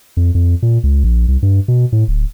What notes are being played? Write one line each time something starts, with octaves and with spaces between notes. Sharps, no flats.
F2
F2
A#2
C#2
A#1
C2
G2
B2
A2
D1